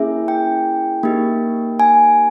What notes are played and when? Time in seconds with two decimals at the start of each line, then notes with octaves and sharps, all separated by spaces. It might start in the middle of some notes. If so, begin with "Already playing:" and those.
Already playing: A#3 C#4 E4 G#4 E5
0.28 G5
1.03 A#3 D#4 G4
1.80 G#5